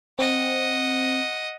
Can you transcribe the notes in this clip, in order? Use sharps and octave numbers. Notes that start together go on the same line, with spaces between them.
C4 D#5 F#5